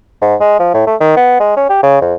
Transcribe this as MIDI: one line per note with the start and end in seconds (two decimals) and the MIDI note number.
0.21 0.35 44
0.40 0.56 56
0.59 0.74 53
0.74 0.82 45
0.87 0.95 57
1.00 1.15 51
1.17 1.39 59
1.40 1.55 56
1.57 1.66 61
1.69 1.78 67
1.83 2.00 49
2.01 2.14 41